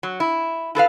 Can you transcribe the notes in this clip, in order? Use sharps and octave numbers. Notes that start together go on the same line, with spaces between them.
F#3
E4
E4 A4 B4 F5